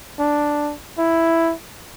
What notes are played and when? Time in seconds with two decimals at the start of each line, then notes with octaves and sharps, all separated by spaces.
0.19 D4
0.98 E4